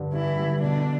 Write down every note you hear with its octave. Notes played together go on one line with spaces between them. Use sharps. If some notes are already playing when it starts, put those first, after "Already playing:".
Already playing: G2 D3 G3
G2 E3 E4
D3 G3
B2 D3 D4